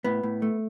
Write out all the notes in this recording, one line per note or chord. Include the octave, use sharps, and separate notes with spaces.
A2 B3
A2
A3